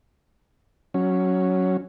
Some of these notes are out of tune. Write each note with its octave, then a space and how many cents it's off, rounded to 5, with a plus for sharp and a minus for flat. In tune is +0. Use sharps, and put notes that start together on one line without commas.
F#3 +0 C#4 +0